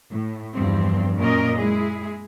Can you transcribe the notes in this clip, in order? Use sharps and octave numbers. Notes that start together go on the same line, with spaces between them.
A2
E2 G2 F3 C4
F#2 A#2 C#4 A#4 D#5
G#3 E4 G#4